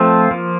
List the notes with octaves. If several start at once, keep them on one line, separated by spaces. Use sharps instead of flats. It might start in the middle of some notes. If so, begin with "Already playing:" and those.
Already playing: F3 A3 C4 F4
F3 A#3